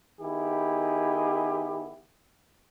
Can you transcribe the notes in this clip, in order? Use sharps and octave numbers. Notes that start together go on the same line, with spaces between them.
D#3 B3 E4 G4 G#4